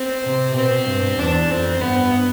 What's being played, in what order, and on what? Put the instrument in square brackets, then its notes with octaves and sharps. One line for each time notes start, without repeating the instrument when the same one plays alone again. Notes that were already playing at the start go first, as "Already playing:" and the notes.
Already playing: [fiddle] C4
[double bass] C3
[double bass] B2 [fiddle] C4
[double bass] G2
[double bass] E2 [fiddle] D4
[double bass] F2 [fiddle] C4
[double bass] G2 [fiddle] B3